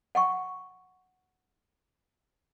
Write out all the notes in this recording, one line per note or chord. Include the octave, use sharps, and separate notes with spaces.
F#5 G5 C#6